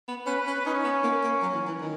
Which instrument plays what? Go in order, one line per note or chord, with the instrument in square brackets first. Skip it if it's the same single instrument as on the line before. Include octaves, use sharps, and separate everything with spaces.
[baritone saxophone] B3
[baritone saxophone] C#4 [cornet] B4
[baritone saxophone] C#4
[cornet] C#4 [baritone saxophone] D#4
[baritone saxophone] B3
A#3
A#3
F#3
E3
E3
D#3